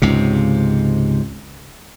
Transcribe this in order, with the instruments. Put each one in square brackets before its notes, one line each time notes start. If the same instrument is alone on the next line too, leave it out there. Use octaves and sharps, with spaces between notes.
[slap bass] C#2 G#2 C3